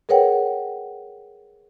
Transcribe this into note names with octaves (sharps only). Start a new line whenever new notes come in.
G#4 A#4 B4 C#5 F#5 G5